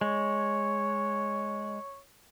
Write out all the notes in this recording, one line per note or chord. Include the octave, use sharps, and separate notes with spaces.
G#3 C#5